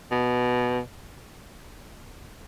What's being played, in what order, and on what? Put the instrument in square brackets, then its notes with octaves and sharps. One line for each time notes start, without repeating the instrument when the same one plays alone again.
[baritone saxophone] B2